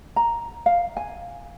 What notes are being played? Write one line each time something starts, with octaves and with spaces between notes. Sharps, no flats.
A#5
F5
G#5